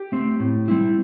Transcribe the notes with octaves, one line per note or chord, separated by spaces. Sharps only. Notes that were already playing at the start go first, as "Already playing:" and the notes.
Already playing: G4
A3 C4
A2
G3 C4 E4